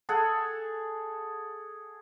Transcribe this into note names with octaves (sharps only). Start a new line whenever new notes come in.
G#4 A4 F#5